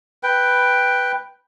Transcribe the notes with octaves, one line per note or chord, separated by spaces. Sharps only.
B4 G5